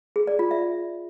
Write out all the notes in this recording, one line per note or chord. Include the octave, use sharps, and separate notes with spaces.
G#4
D5
F4
E5